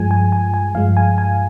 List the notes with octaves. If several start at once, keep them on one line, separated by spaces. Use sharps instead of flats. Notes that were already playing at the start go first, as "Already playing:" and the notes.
Already playing: G2 F3 G#3 G#5
G#5
G#5
G#5
G2 F3 G#3 F5
G#5
G#5